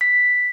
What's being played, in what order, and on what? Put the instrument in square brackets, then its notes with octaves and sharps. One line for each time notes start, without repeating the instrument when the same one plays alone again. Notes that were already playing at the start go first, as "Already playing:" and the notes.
[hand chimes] B6